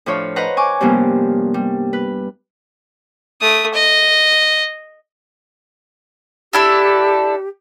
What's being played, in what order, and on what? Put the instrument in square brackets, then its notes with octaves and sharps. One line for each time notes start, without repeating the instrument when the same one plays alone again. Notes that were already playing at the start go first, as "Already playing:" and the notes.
[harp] A2 F3 D4 F4 C#5
B4 C5 D#5 F#5 A#5
G#5 C#6 D6
G2 C3 F3 G3 A#3 B3
G3
B4
[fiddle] A3 D#6
D#5
[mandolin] D4 E4 A4 [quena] G4